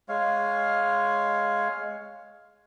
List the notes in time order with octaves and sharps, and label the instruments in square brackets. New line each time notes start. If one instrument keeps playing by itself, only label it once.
[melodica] G#3 C#5 F5